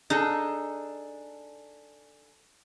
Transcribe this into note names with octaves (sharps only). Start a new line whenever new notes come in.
D4 D#4 G#4 A4